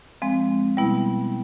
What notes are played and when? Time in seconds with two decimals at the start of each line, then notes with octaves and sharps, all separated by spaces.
0.22 F3 G#3 C4
0.77 B2 G3 B3 E4